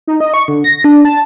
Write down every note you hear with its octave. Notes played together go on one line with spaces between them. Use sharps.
D#4
D#5
C#6
D3
A#6
D4
A5